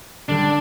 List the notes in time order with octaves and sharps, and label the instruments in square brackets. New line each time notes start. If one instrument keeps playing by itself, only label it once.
[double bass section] D3 G3 [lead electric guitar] D4